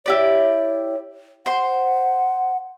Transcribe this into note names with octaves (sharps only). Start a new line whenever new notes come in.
E4 G4 C#5 D5
C5 F#5 C6